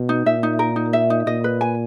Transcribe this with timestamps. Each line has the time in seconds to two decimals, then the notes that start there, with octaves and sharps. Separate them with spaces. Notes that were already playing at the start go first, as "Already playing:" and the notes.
Already playing: B2
0.09 D#4
0.26 A#2 E5
0.43 D#4
0.59 A#4
0.76 D#4
0.93 E5
1.10 D#4
1.26 A#2 D#5
1.44 B4
1.61 G#5